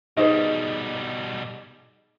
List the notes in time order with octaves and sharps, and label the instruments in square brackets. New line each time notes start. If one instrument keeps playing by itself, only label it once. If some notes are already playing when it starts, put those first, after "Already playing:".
[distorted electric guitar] B2 G3 [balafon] D#4 B4 [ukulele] G#4 C5 D#5